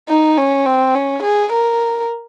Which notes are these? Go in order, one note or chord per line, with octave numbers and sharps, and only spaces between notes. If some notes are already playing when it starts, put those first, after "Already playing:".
D#4
C#4
C4
C#4
G#4
A#4